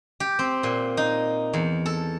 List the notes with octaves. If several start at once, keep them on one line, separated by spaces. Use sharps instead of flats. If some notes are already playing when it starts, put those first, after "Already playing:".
G4
C4
A#2
D#4
E2
A4